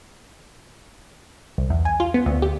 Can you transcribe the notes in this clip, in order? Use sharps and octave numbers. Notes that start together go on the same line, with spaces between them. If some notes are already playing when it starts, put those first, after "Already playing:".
C2
E2
G#5
F4
B3
D2
G4